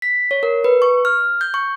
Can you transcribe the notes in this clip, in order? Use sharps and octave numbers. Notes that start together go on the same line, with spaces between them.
B6
C#5
A#4
B4
C#6
F6
G6
C#6